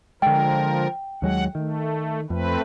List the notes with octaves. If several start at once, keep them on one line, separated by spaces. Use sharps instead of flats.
D3 F3 G#3 A#4 G5
D#2 F#3 G#3 F#5
D#3 A3
F2 A3 C4 B4